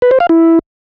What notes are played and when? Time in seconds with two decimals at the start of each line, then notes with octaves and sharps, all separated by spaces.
0.02 B4
0.11 C5
0.20 F5
0.29 E4